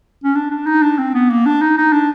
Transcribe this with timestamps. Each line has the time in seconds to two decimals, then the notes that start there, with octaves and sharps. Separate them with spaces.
0.24 C#4
0.35 D4
0.51 D4
0.66 D#4
0.83 D4
0.98 C4
1.14 B3
1.30 A#3
1.46 D4
1.62 D#4
1.78 D#4
1.93 D4